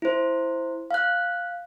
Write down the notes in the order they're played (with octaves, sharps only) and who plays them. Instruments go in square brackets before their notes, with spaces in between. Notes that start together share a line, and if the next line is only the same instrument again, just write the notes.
[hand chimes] E4 C5
F5 F#6